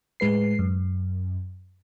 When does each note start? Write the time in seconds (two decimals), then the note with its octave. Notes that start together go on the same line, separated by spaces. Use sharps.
0.20 A2 G#3 B4 C7
0.59 F#2